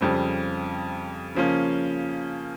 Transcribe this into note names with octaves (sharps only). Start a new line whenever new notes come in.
F2 C#3 G3 C4
C#3 F3 A#3 C#4